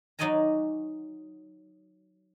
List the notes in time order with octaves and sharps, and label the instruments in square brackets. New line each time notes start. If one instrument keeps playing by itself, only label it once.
[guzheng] F#3 D#4 D5 D#5 G#5 A#5